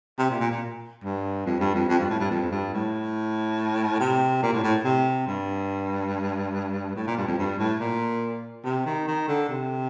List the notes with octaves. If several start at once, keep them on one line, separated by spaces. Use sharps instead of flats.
C3
A#2
A#2
A#2
G2
F2
G2
F2
F2
G2
A2
G2
F2
G2
A2
C3
A#2
A2
A2
C3
G2
A2
A#2
G2
F2
G2
A2
A#2
C3
D#3
D#3
D3
C3